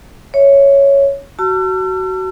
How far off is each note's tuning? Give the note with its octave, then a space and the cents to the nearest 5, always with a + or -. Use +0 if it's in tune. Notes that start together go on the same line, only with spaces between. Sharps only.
C#5 +0 E5 +0
F#4 +20 A5 +30 E6 +45